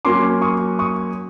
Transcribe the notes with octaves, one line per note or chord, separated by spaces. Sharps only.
F#3 A#3 C#4 C6 D6
C#6 D#6
C#6 D#6